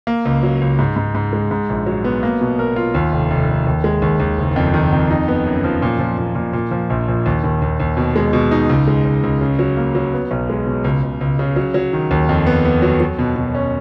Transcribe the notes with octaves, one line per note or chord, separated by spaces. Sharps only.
A#3
C#2
F#3
C#2
G#2
G#2
G#2
G#3
G#2
A#1
F#3
B3
A#3
B2
A#4
F4
D#2
F1
F1
F1
D#2
G#3
D#2
D#2
F#1
F2
D#3
F2
D#4
B3
F#2
F3
A#2
F3
A#2
A#2
A#2
F3
A#1
A#1
D#2
D#2
D#2
D#2
B2
G#3
B2
D#4
C#2
G#3
C#2
C#2
C#3
F#3
A#3
F#3
B3
B1
G#3
B2
C#2
C#2
C#2
C#3
F#3
F#3
D#3
D#2
F2
B3
B3
F#3
F#3
B2
B2
C#4